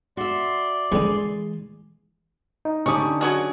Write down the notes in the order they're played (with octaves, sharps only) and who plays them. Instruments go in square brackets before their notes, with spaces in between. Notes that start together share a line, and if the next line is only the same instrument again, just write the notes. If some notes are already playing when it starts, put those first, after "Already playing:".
[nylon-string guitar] F#4 E5 [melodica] D5 C6
[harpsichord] F2 D3 [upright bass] E3 G#3 [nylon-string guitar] G#4
[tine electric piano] D#4
[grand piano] D3 G4 D#6 [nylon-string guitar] C#4 D5 [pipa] C#6
[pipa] F#3 F#4 G#4